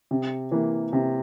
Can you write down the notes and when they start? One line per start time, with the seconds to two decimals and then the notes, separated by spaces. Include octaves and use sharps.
0.11 C3
0.52 E3 A#3
0.93 C3